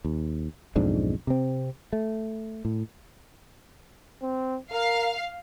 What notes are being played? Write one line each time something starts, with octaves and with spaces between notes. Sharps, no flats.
D#2
B1 F2 G#2 D4
C3 C4
A3
A2
C4
A#4 F5